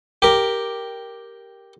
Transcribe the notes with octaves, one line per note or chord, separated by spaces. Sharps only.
G4 A#4